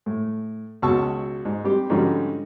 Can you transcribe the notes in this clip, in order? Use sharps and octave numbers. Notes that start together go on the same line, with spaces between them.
A2
C#2 B2 F#4 A5 C#6 E6
G#2
G3 C4 G4
G#2 D3 F3 G3 C#4 F#4